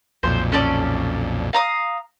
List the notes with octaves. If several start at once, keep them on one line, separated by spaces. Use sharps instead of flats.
B1 F2 A#2 C5
C#4 A4 D5
F5 A#5 D#6